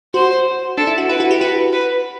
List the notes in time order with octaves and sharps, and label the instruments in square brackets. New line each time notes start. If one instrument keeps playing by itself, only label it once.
[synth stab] F#4 [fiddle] C5
[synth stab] D4 [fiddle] A4
[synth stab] E4
F#4
[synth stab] E4 [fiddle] B4
[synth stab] F#4
G4
[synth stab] F#4 [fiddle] B4
[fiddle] B4